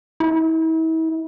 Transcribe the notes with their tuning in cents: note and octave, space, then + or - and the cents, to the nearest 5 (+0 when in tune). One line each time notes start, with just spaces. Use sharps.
E4 -40